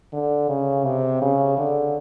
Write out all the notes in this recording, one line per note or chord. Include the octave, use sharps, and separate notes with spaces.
D3
C#3
C3
C#3
D3